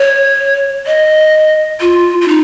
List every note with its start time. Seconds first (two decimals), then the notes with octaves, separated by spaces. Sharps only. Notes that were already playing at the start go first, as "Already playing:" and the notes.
Already playing: C#5
0.87 D#5
1.81 F4
2.21 F4
2.28 D#4